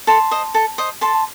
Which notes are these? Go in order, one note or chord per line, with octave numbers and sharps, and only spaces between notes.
A4 A5 C6
C5 D#5
A4
C5 D#5
A4 A5 C6